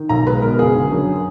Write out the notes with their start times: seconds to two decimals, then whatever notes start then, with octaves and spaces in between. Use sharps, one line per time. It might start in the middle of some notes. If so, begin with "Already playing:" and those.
Already playing: D#3
0.09 B1 A#5
0.27 G#3 B4
0.42 B2 A#4
0.59 F#1 G#4
0.75 D3
0.92 F#2